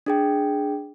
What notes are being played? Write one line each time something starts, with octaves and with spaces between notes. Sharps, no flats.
D4 G#4 G5